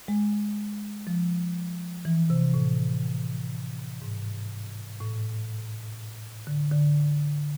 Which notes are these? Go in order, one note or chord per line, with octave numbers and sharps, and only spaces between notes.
G#3
F3
E3
C3
A2
G#2
A2
D3
D3